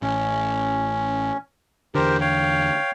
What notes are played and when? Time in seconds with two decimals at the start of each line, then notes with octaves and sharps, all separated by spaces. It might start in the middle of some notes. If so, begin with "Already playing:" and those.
0.02 A1 C#4
1.95 E2 D3 G4 A#4 C5
2.21 C#5 F5 G5